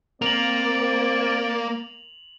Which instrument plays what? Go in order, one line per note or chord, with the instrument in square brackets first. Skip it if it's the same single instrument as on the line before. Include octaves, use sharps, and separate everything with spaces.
[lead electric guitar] A#3 [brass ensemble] C4 [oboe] D5 [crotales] F7 F#7